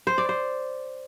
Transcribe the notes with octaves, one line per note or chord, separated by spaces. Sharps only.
C5
D5
C5